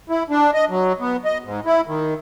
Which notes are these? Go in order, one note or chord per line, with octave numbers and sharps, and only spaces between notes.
E4
D4
D#5
F#3
B3
D#5
G#2
E4
D#3